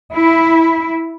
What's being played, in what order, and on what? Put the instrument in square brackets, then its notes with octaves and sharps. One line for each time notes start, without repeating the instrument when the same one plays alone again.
[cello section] E4